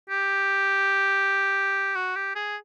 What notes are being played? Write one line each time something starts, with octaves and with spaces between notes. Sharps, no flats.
G4
F#4
G4
G#4